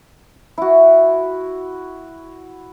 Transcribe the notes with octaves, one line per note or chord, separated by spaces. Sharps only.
E4 F#4